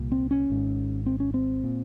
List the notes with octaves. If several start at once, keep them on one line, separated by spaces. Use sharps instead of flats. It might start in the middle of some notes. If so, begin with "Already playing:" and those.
Already playing: C2 A#2
C4
C#4
G#1 G#2
C4
C#4
C4
A#2